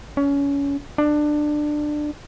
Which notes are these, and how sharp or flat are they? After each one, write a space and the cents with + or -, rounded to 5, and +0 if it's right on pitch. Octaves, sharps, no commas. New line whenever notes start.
C#4 +25
D4 +20